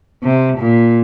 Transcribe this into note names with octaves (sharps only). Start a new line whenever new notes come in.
C3
A#2